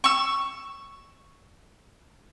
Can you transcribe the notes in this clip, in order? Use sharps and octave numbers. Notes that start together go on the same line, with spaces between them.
C#6 E6